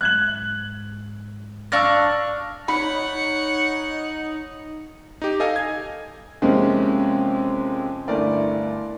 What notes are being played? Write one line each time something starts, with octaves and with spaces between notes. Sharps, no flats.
G#2 F#6 G#6 F#7
D4 F5 C#6 E6 A#6
D#4 C#5 F#5 B5
D#4 G4
A4 D#5 F5 G#5
G#6
F2 C3 G#3 A#3 C#4
G1 A3 E4 A#4 D5